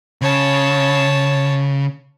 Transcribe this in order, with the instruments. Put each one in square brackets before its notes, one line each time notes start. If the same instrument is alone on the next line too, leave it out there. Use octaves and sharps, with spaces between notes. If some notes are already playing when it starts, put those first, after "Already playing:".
[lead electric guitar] C#3 [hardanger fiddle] C#5 A5